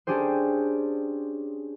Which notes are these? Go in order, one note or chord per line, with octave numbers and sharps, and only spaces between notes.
C#4 D4 G4 G#4 C5